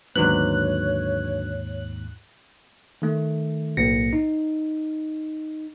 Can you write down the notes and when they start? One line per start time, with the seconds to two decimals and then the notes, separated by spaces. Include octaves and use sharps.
0.16 D#2 G#2 D3 F#3 B3 C#5 F#6
3.02 D#3 A3
3.77 B1 A2 A#3 A#6 C#7
4.13 D#4